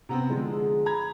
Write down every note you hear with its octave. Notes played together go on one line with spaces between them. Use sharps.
C3 B3 C4 A#5
D3 F3 G#3 G#4
A#5 B5 G#6